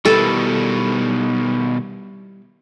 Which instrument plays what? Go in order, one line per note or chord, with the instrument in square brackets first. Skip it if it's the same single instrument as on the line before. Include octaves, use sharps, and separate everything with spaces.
[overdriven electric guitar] B2 D#3 [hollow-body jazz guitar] G3 E4 B4 [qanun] A4